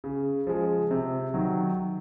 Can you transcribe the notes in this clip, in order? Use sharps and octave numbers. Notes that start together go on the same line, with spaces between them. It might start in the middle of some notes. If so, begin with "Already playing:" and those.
C#3
F3 G#3
C3
D#3 F#3